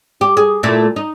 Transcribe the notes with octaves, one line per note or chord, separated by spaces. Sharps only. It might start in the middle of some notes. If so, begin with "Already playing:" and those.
G4
G#4
A#2 A3 E4
D#4